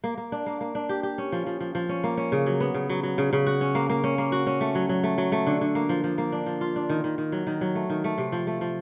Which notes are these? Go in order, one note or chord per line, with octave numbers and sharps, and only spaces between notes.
A#3
A#3
D4
A#3
A#3
D4
G4
G4
C#4
F3
F3
F3
F3
C#4
A#3
C#4
C#3
F#3
B3
C#3
F#3
F#3
C#3
C#3
F#4
C#4
A#3
A#3
C#4
A#3
F#4
C#4
A3
F#3
F#3
A3
F#3
A3
D3
D3
A#3
F3
F3
A#3
D4
F3
F4
D4
D#3
D#3
D#3
F#3
D#3
F#3
A3
D#3
A3
C3
F3
A3
F3